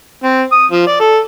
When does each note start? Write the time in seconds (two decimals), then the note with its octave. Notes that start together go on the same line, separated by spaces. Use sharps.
0.23 C4
0.52 D#6
0.71 F3
0.87 D5
1.00 A4